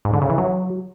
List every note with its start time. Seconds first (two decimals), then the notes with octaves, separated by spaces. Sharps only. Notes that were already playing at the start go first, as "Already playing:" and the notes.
0.05 G#2
0.13 D3
0.21 C#3
0.30 E3
0.38 F#3